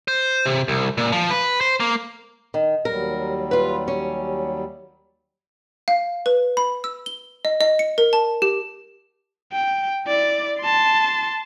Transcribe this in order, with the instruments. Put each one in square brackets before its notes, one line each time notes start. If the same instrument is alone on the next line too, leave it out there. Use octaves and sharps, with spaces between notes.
[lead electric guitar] C5
C3
C2
A#2
F3
B4
C5
A#3
[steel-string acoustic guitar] D#3
[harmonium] D#2 F#3 G3 [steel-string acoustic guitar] A#4
[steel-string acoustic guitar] F4 B4
C#4
[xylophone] F5
B4
B5
E6
G7
D#5
D#5
C#7
A#4
A5
G4
[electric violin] G5
E4 D5
A5 C6